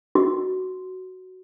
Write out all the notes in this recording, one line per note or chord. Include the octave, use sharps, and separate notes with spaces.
F#4